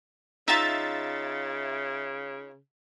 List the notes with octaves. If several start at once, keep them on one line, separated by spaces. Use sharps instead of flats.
C#3 D#4 F4 E5 A6